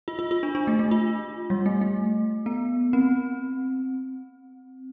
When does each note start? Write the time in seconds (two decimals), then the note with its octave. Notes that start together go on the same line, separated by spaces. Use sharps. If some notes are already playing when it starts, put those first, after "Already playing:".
0.08 F4
0.19 F4
0.31 F4
0.43 D4
0.55 D4
0.67 A3
0.79 A3
0.91 F4
1.50 G3
1.66 A3
1.81 A3
2.46 B3
2.93 C4